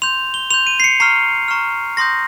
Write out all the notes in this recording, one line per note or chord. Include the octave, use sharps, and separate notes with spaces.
C6 G6 F7
G7
C6 G6 F7
D#7
C7
C#7
A#5 C#6 F6 C7
A#5 C#6 F6
C6 D#6 G6 A#6